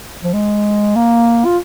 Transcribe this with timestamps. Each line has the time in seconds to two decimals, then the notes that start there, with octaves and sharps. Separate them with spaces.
0.24 F3
0.33 G#3
0.96 A#3
1.45 F4